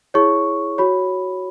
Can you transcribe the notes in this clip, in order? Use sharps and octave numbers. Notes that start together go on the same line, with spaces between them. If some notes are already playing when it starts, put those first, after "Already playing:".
E4 G#4 C#5 C#6
F#4 C#5 B5